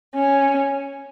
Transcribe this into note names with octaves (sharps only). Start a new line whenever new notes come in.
C#4